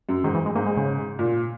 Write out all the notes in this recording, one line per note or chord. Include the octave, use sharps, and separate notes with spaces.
F#2
G#2 D#3
E3
G#3
G#2 A#3
G#3
C#3
A#2